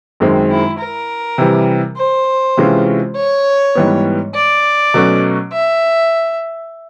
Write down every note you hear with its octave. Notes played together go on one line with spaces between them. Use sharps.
F#2 D#3 G#3 C4
E4
A#4
C3 E3 G3
C5
C3 E3 G#3 C#4 F4
C#5
G#2 E3 G3 B3
D5
B2 F#3 A3 C#4 F#4
E5